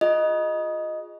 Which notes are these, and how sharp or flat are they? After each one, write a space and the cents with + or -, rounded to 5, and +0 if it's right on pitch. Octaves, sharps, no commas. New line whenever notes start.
F4 +10 G#4 +0 D#5 +0